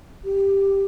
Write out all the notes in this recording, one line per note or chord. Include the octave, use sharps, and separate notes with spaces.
G4